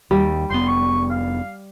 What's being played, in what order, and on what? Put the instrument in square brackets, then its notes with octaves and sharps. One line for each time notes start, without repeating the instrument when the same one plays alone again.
[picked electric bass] D#2 [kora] G3
[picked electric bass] F1 B3 [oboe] C6
[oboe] C#6
F5